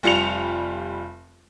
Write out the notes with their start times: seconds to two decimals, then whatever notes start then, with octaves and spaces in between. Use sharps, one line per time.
0.03 F1 G3 F4 C#7 F7